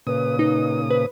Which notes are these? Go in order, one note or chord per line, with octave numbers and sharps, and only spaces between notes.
A#2 C#3 B4 D#6
D#4 B4
B4 C5